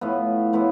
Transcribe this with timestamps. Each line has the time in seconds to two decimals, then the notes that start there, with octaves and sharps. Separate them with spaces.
0.01 A2 F3 B3 E4
0.53 A2 F3 B3 E4